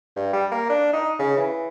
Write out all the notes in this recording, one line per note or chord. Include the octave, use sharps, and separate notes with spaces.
G2
G3
A#3
D4
D#4
C#3
E3